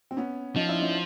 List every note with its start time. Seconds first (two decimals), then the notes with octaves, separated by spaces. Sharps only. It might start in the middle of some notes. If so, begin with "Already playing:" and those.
0.11 C4
0.17 B3 C#4
0.56 F3 C#4 D#4
0.69 D4 E4
0.81 C#4 D#4